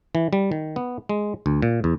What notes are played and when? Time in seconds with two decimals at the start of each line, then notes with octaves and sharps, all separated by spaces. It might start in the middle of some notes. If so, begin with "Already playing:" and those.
0.15 E3
0.33 G3
0.52 D#3
0.76 B3
1.09 G#3
1.46 D2
1.62 A#2
1.84 E2